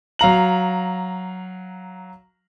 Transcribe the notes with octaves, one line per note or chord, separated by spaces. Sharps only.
F#3 F5 A#5 F#7